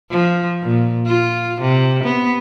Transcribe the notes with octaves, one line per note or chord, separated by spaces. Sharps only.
F3
A#2
F4
C3
B3